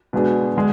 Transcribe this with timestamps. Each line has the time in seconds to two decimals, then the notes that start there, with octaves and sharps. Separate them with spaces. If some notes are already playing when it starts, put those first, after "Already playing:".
0.13 B2 G#3 B3 D4 G#4
0.57 D3 G#3